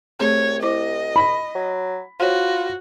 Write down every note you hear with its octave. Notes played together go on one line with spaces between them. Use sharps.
C2 A3 C4 G#4 C#5
E4 C5 D#5 D6
B5
F#3
F4 F#4 C5 C#5